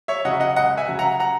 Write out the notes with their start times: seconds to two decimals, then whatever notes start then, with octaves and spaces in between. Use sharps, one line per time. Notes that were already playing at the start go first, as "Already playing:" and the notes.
0.08 C#5 E5
0.25 C#3 F#3 D#5 F#5
0.40 D#5 F#5
0.56 C#2 D#5 F#5
0.77 E5 G#5
0.88 C#3 F#3
0.99 F#5 A#5
1.20 F#5 A#5